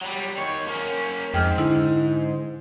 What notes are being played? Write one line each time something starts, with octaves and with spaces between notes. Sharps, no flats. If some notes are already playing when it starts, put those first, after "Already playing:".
F#3 G3
D#2 C#5
A#3 C#4
F2 G#2 G5 F6
D3 E4